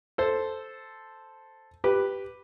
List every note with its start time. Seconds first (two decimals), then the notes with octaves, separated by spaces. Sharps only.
0.18 A4 C5
1.84 G4 B4